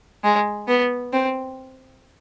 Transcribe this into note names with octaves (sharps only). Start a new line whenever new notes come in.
G#3
B3
C4